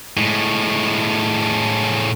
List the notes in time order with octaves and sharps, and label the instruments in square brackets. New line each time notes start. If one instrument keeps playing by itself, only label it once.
[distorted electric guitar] A2 G#3